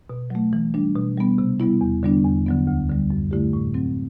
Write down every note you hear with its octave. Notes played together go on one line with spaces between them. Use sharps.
B2
F#3 A3
E3
G3 D4
B2
G3 B3
C3
G3 B3 E4
E2
D3 G3 B3 D4
E2
D3 F#3 B3
D2
D3 G3
F#2
D3 A3 E4 G4
A2
F#3 C4